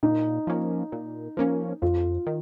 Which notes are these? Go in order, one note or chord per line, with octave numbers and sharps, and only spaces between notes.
A#2 D#4
F3 A#3 C#4
A#2
F3 A#3 C#4
F2 F4
D#3